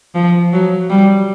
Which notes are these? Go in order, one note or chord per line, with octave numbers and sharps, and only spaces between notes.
F3
F#3
G3